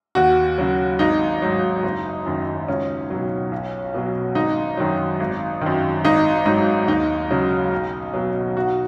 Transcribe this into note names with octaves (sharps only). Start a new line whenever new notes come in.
D#2 F#4
C#3 F#3
G#1 D#4
G#2 F#3
F#1
F#2 D#3
C#2 C#4
B2 F#3
B1
B2 F#3
G#1 D#4
F#2 D#3 F#3
G#1
F#2 D#3
G#1 D#4
G#2 F#3 D#4
D#2 D#4
C#3 F#3
B1
B2 F#3
B1 F#4